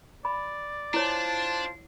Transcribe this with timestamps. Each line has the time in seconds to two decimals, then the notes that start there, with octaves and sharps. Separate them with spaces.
0.25 D5 B5
0.94 D4 E4 F4 C5 C#5 A5